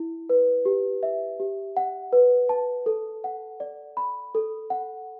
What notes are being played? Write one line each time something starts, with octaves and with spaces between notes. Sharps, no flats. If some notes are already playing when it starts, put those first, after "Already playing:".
Already playing: E4
B4
G4
E5
G4
F#5
B4
A5
A4
F#5
D5
B5
A4
F#5